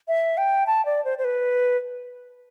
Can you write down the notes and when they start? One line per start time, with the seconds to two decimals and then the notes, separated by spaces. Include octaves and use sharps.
0.08 E5
0.38 G5
0.67 A5
0.86 D5
1.05 C5
1.18 C5
1.25 B4